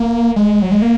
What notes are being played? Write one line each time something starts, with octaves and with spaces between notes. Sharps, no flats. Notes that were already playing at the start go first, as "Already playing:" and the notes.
Already playing: A#3
G#3
F#3
G#3
A#3